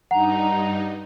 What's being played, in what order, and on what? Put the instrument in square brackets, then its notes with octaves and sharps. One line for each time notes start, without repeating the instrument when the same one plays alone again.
[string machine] G2 D#4 [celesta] F#5 [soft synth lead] A#5